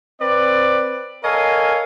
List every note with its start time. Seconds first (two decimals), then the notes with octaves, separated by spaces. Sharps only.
0.21 C4 B4 D5
1.23 A4 A#4 C#5 D#5 F5 G#5